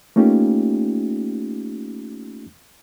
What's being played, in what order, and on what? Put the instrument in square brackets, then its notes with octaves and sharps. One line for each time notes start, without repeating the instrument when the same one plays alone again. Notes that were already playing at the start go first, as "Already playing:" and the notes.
[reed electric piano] A3 A#3 C#4 D#4 F4 G4